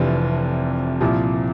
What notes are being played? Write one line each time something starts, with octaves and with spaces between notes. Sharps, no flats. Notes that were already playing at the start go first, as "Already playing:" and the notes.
Already playing: F1 F2 C3 E3 D4
C2 A#2 F3 E4